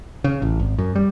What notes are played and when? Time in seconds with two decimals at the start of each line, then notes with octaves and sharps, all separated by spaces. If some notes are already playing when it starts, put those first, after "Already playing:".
0.24 C#3
0.42 A1
0.59 G#1
0.78 F#2
0.96 G3